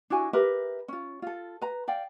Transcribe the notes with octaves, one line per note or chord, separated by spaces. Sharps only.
D4 E4 F#4 G#5
G4 A#4 B4 E5
C#4 F4
F4 A4
B4 A#5
D5 F5 G5